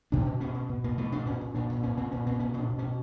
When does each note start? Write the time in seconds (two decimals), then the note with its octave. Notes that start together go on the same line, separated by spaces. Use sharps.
0.12 B2 D4
0.26 B2
0.40 B2 C#4
0.55 B2
0.69 B2
0.84 B2 A#3
0.98 B2 A3
1.12 B2 D4
1.26 A#2 C#4
1.41 A#2
1.54 A#2 D4
1.70 A#2
1.83 A#2 C#4
1.97 A#2 C4
2.11 A#2 C#4
2.26 A#2 C4
2.39 B2 C#4
2.54 B2
2.59 D4
2.69 B2
2.79 C#4
2.82 B2